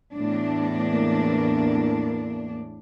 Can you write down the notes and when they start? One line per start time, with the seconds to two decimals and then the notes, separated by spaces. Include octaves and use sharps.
0.13 E2 A2 D4
0.90 A#3